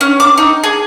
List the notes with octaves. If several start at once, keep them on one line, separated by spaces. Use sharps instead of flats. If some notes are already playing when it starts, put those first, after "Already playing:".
C#4
D6
D#4
G#4